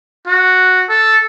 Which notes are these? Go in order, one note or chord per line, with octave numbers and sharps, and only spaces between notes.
F#4
A4